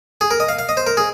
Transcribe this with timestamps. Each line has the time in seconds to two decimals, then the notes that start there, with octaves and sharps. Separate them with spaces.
0.21 G#4
0.31 A#4
0.40 D#5
0.49 F5
0.59 F5
0.69 D#5
0.77 C5
0.87 A#4
0.97 G#4